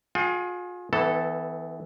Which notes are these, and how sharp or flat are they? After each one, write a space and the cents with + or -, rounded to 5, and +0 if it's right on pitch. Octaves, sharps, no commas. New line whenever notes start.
F4 +40 G#4 +15 G5 +0
E3 -20 B3 +20 A4 +0